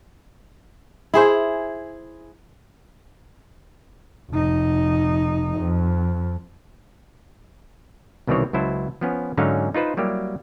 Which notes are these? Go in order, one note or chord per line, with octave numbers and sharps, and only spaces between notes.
E4 G#4 C5
F1 D#4
F2
C2 B2 D#3 E3 C4 C#5
C#2 F#3 E4 C5 A5
F3 B3 C#4
G#2 D3 F#3 C#4 D#4 F5
D#4 F4 B4 C5
F#3 G3 A#3 E4 G4